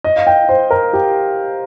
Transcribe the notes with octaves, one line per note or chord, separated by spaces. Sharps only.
D#5
F5
G5
C5
A#4
G4